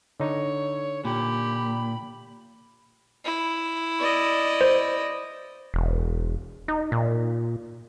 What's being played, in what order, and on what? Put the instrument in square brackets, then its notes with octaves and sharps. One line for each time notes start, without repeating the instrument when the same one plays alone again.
[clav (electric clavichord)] D3 D#4 [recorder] C#5
[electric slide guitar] A#2 [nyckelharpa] G4 [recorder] B5
[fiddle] E4
[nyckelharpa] D5 D#5
[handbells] C5
[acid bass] E1
D#4
A#2